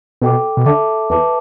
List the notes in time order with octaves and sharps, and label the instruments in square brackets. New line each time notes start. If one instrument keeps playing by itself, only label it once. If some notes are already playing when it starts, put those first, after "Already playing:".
[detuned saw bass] B2 [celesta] A4 G5 D6
[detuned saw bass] B2
[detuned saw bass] D3 [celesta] A4 E5 A5 D6
[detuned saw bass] E2 [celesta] B4 E5 A5 D6